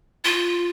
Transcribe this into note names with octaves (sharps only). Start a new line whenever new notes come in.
F4